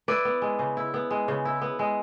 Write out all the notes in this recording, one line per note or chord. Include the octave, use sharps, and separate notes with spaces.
E4 B4 D5
B3
G#3
C#3
E4
B3
G#3
C#3
E4
B3
G#3